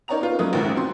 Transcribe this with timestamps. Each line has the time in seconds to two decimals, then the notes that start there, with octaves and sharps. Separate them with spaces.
0.08 D#4 A#4 C#5 D5 A#5 F7
0.21 B3 F4
0.39 F#3 A3 A#3 C#4 B4 D#6
0.53 A#1 D#2 G#2
0.76 C4 F#4 C6